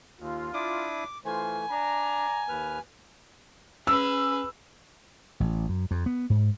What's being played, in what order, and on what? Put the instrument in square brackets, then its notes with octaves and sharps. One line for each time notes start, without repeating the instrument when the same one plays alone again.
[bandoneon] D#2 [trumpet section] F4
[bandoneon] D4 E4 D#6 [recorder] D6
[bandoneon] E3 A3 [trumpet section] F4 C5 [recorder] G#5
[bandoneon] D4 [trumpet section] D5 A#5
[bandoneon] D#2 B4 F6
[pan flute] C#4 [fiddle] G#4 B4 [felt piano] E6
[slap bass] A1
F#2
F2
B3
G#2